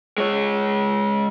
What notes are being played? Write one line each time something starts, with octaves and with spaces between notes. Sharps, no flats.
G#3 C#5